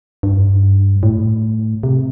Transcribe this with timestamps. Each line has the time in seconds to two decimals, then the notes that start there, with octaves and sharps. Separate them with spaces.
0.23 G2
1.03 A2
1.83 C3